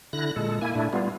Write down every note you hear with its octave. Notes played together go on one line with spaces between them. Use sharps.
D3 E4 F#6 A#6
A#2 G#3 A4
A#3 E4 G#5
A#2 A3 D4 E4
G3 B3 F4